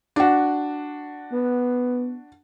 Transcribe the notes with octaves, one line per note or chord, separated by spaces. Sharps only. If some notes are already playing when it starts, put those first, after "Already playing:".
D4 F#4
B3